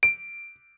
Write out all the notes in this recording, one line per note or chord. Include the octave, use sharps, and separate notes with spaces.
D7